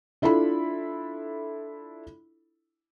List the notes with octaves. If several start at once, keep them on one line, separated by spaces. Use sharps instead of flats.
D4 E4 F4 A4 B5